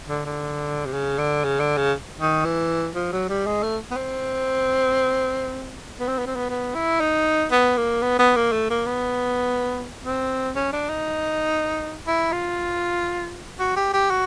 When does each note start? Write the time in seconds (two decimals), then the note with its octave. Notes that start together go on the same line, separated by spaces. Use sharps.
0.09 D3
0.26 D3
0.86 C3
0.93 C#3
1.19 D3
1.44 C#3
1.60 D3
1.77 C#3
2.20 D#3
2.45 E3
2.95 F3
3.13 F#3
3.29 G3
3.46 G#3
3.63 A3
3.91 B3
3.97 C4
5.99 B3
6.09 C4
6.18 B3
6.27 C4
6.36 B3
6.50 B3
6.75 E4
7.01 D#4
7.52 B3
7.77 A#3
8.02 B3
8.19 B3
8.36 A#3
8.52 A3
8.70 A#3
8.86 B3
10.05 C4
10.56 C#4
10.72 D4
10.89 D#4
12.07 E4
12.32 F4
13.60 F#4
13.76 G4
13.93 G4
14.10 F#4